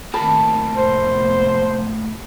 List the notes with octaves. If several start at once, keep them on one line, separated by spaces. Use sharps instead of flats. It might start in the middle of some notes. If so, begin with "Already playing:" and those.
A2 D#3 A#3 C4 A5 B5
F1 B3 C5